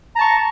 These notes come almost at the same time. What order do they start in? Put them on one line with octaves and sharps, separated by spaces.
A#5 A5 C#6